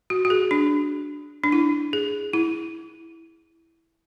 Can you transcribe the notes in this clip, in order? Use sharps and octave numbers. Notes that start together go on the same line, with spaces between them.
F#4
F#4
G#4
D4
D4
E4
G#4
E4